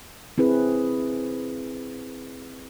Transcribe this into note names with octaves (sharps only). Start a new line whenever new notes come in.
C4 E4 G#4 B4